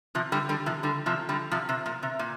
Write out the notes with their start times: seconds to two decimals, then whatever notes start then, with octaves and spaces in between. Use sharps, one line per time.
0.15 C3 F3
0.32 D3 G3
0.49 D3 G3
0.66 C3 F3
0.83 D3 G3
1.06 C3 F3
1.29 D3 G3
1.51 C3 F3
1.69 C3
1.86 A#2
2.03 C3
2.19 A#2